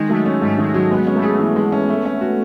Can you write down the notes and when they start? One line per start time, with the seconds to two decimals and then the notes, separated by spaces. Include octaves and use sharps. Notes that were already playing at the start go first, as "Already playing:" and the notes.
Already playing: D#3 G#3
0.09 F#3 A3
0.25 C#4
0.42 G#2 A3
0.58 D#3 G#3
0.74 F#3 G#3
0.91 G#3 B3
1.07 C#4
1.15 A3
1.23 G#4
1.39 E3
1.56 G#3
1.72 C#4
1.89 A3
2.05 C#4
2.21 F#4